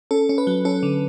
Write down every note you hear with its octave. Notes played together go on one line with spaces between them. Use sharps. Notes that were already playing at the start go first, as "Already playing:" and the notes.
C#4 A4
C#4
B4
F#3
C#4 A4
D3